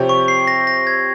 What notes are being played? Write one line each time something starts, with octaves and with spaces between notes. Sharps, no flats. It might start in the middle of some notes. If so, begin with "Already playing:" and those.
Already playing: C3 F3 C4 G4 C#5
C#6
C7
A#6
A#6
G#6